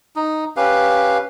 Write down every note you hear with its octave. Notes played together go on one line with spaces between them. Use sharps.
D#4
C#4 G4 B4 F5